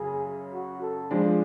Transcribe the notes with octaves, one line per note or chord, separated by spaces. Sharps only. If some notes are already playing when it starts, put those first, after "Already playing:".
Already playing: F#2 C#3 G#4
F#4
A4
F3 G#3 D4 G#4